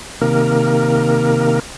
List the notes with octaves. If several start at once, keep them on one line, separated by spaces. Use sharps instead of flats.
C3 D#3 A#3 A#4